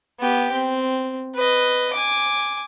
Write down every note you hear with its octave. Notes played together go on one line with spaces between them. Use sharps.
B3 G4
C4
B4 D#5
G#5 D6